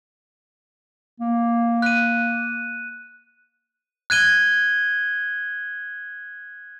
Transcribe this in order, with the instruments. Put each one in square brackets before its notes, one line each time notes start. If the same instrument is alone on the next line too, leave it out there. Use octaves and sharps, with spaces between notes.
[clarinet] A#3
[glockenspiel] F#6 D#7
F#6 G#6 D#7 G7